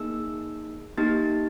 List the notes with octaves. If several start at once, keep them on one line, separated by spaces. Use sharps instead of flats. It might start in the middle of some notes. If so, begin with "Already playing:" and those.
Already playing: A#3 D#4 G#4 E6
A#3 D#4 G4 A6